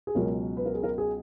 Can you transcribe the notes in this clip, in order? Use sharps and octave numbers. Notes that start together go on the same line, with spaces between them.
G#4
C#2 B2 F#3 C#4 A#4
B4
A#4
G#4
A#4
G#4